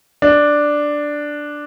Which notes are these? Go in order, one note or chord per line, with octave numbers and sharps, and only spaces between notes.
D4